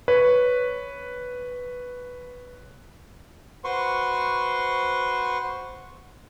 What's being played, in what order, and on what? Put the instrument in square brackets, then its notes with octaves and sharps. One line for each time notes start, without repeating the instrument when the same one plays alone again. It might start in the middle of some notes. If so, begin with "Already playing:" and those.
[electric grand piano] B4 C#5
[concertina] F#4 B4 C5 C6 C#6